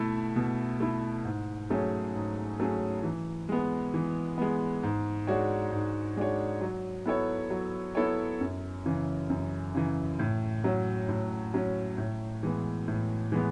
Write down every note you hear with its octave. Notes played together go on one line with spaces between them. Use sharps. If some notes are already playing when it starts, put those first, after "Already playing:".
Already playing: B2 A3 E4
B2
A3 E4
G#2
F#3 A3 C#4 G#4
G#2
F#3 A3 C#4 G#4
E3
G#3 B3
E3
G#3 B3
G#2
G#3 D4 F#4 C#5
G#2
G#3 D4 F#4 C#5
F#3
B3 E4 A4 C#5
F#3
B3 E4 A4 C#5
F#2
C#3 E3
F#2
C#3 E3
A2
F#3 C#4
A2
F#3 C#4
A2
E3 G#3 B3
A2
E3 G#3 B3